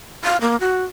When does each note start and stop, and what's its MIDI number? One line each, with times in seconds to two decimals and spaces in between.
0.24 0.37 77
0.41 0.56 58
0.60 0.83 66